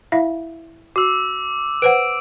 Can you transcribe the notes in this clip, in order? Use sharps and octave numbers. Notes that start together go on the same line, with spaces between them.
E4 E5 F5
F#4 D6 E6
B4 C5 F#5 D7